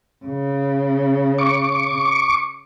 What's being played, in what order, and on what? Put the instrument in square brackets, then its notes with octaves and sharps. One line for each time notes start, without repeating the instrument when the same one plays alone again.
[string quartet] C#3
[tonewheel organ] C#6 D6